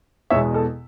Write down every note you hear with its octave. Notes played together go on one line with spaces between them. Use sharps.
E2 B2 G#3 C#5 E5
A4